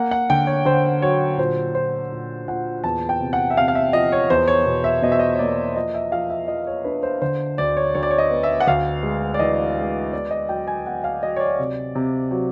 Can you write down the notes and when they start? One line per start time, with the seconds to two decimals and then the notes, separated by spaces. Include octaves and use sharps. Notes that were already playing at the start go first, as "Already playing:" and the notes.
Already playing: A#3 F#5
0.11 F#5
0.30 D3 G5
0.47 C#5
0.65 D3 C5
1.02 F#3 C#5
1.38 A#2 C5
1.75 A#2 C5
2.12 A#2
2.48 A#2 F#5
2.84 E2 A5
3.09 G5
3.20 C3
3.33 F#5
3.50 E5
3.57 C3 F5
3.68 F5
3.75 E5
3.93 F3 D#5
4.12 C#5
4.30 E2 C5
4.48 C#5
4.66 B2
4.84 E5
5.02 B2 D#5
5.12 E5
5.19 D#5
5.35 C#5
5.39 A#3 D5
5.76 F3 D#5
5.94 E5
6.12 F3 F5
6.30 E5
6.48 F3 D#5
6.67 C#5
6.85 D4 B4
7.03 C5
7.22 D3 C5
7.58 D2 D5
7.77 C#5
7.95 D2 C#5
8.03 D5
8.11 C#5
8.18 D#5
8.30 B3
8.43 E5
8.60 F#5
8.67 D2 F5
9.03 G#3
9.34 D5
9.39 E3 D#5
9.77 G#3
10.12 B3 D5
10.31 D#5
10.49 F#3 G5
10.67 G#5
10.86 B3 F#5
11.04 F5
11.22 F#3 D#5
11.36 C#5
11.40 D5
11.59 C3
11.95 C3
12.31 F#3